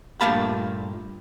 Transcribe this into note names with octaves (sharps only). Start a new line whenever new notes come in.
G2 A#2 A3 F5 A5 B5